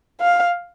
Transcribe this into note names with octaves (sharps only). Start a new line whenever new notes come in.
F5